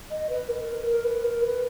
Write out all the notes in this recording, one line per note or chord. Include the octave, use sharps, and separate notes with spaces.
D#5
B4
A#4
A#4
A#4
B4
A#4
B4